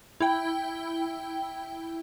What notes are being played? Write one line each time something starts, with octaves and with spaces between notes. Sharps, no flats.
E4 G5